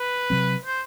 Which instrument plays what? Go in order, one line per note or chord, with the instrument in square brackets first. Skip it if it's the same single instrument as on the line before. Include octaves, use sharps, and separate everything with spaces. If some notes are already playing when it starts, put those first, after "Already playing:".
Already playing: [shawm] B4
[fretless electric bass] C3 F#3 C4
[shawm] C5